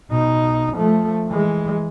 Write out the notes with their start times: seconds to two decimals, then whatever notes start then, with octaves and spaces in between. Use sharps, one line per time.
0.10 B2 D#4
0.75 F3 A3
1.28 E3 G#3